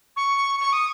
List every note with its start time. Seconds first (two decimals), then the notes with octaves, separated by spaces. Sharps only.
0.17 C#6
0.60 C#6
0.73 D#6